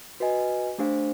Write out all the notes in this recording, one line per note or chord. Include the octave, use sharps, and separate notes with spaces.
F#4 B4 D#5 G#5
A3 D4 G4 C5 F5